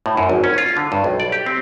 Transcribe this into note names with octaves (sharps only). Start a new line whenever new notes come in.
A2
F#2
G#1
C#4
F4
D3
G2
B1
D5
G4
C4